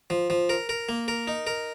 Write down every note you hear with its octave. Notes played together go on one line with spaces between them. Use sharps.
F3
F3
A#4
A#4
A#3
A#4
D#4
A#4